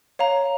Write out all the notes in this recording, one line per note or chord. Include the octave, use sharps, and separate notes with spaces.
C#5 F5 A#5